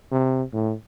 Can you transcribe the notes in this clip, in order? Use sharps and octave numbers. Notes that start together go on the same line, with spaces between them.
C3
A2